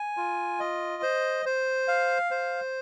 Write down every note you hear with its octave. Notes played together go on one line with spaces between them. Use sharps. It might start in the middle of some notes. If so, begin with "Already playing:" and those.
Already playing: G#5
F4
D#5
C5
C5
F5
C5